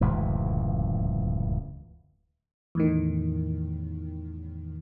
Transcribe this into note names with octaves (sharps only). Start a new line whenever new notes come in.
D1 C#2 F#2 E3
E2 A2 D#3